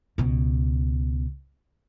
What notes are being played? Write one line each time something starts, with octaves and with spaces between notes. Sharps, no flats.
C#2 B2